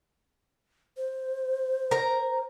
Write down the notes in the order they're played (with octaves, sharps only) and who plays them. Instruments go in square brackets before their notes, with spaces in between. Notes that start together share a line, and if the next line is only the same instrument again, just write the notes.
[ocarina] C5
[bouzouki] A#4 A#5